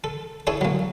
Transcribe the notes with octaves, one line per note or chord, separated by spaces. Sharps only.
A4
E4 G#4 A4 C#5
F#3 A#3